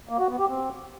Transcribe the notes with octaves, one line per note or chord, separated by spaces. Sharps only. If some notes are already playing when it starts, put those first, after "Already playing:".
A#3
F#4
B3
G4
C4